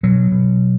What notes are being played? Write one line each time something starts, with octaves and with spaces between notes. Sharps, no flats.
B2 F#3
B2